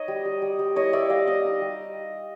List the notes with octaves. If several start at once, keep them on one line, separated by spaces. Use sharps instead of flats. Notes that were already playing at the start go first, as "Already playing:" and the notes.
Already playing: D#4 C#5 D#5
G3
G3
G3
G3
E4 C#5 D#5
G3 D5 E5
G3 D#5 F5
G3 D#5 F5
D#4
G3